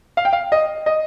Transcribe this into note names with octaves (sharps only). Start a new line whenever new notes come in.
F5
G5
F5
D#5
D#5